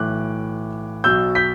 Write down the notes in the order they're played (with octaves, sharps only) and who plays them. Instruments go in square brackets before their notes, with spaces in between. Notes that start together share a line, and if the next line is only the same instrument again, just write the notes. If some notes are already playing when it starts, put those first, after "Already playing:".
Already playing: [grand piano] B1 A2 E3 D6 F#6
B1 B2 F#3 E6 G6
G6 B6